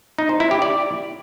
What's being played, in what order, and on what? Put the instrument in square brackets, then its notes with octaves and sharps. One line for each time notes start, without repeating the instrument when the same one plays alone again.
[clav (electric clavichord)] D#4
C5
E4
G4
D5